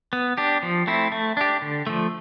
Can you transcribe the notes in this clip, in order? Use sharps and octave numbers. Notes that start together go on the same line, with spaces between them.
B3
D4 G4
F3
A3 C4 E4
A3
D4 G4
D3
F3 A3